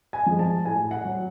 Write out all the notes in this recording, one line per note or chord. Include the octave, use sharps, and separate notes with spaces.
G#5
F3 G#3
A5
A2 G#5
F#5
F#3